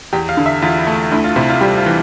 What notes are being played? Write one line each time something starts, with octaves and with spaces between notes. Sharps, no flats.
E2 G4
F5
D3
E5
E2 F4
E4
A3
D2 E4
F4
C3 E4
F4
G3 G4
F4
E3